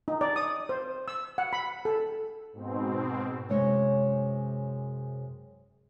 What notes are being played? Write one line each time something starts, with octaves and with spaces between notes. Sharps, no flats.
D#4
D5
D#6
C5
E6
F#5
B5
A4
G#2 B2 C4
F#2 C3 G#3 C#5